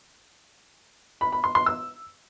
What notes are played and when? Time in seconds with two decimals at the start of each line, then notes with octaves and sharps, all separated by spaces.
1.21 B5
1.32 B5
1.44 C6
1.55 C6
1.66 E6